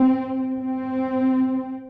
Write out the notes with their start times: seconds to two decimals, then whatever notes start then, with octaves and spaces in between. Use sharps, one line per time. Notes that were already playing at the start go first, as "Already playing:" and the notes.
Already playing: C4
0.58 C4